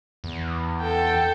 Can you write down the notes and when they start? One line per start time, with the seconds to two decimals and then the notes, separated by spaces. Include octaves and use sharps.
0.24 E2
0.81 A4 G5